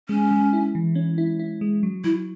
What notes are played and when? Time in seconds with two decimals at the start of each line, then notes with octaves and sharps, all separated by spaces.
0.09 G#3 C#4
0.31 G#3
0.53 E4
0.75 E3
0.95 C#4
1.18 E4
1.39 E4
1.61 G#3
1.83 F#3
2.04 F#3 E4